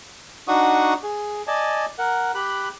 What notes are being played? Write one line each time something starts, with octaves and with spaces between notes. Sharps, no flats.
D4 D#4 F#4 F#5 C#6 D#6
G#4
D5 D#5 G#5 A5
A#4 F#5
G4 B5 F#6